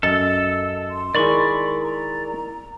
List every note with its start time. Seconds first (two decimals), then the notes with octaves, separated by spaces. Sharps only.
0.03 F#2 A4 D#5 E6 A6
0.90 C6
1.15 D#3 G#3 E4 G#4 A#4 D5 B5 C#6
1.83 A#5